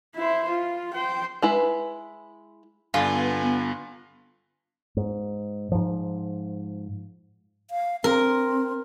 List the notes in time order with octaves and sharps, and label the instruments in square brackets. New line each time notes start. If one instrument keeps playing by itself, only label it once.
[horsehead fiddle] E4 C5
F4
C5 G5
[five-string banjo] G#3 E4 B4
[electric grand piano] G2 D3 [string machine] B3 [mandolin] F4 [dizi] G#5
[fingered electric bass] G#2
G#2 F3
[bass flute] F5
[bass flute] C4 [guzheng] A#4